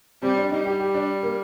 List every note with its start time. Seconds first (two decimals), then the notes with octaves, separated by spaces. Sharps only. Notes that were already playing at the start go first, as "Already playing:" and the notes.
0.22 G3 C4
0.37 D4
0.51 G3 D#4
0.65 G4
0.80 G4
0.94 D4
1.23 A#3